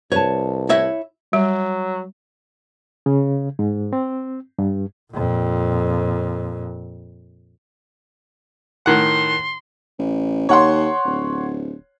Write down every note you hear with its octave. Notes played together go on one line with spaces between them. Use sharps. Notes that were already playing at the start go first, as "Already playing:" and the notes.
C2 B4 C#5 A5
E4 C#5 E5
F#3 G3
C#3
G#2
C4
G2
F2 A#2
A2 D#3 F#5 C6
A1
D#2 C#5 F#5 C6
D1